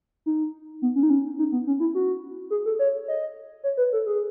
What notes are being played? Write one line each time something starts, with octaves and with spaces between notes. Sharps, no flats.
D#4
B3
C#4
D#4
C#4
D#4
B3
C#4
E4
F#4
G#4
A4
C#5
D#5
C#5
B4
A4
G#4